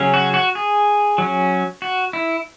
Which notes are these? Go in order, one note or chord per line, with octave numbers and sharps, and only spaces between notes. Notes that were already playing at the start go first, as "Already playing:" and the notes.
Already playing: C#3 F#3 C#4
F#4
F#4
G#4
F#3 C#4
F#4
E4